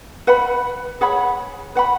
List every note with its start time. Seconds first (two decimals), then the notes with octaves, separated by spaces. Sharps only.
0.27 B4 F#5 B5
1.01 G#4 C#5 F#5 B5
1.75 B4 F#5 B5